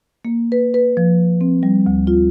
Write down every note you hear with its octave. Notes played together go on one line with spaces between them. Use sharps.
A#3
B4
B4
F3
C4
G3
D2
F4